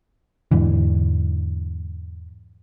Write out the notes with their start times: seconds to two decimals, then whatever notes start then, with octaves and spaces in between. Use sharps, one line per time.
0.51 E2 G#2 D3 E3